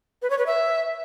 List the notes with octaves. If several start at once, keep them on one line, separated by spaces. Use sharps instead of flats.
B4
C#5
B4
E5